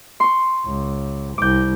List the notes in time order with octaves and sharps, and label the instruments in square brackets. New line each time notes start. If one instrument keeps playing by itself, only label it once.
[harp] C6 C#6
[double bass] C#2
[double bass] C2 [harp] D6 G6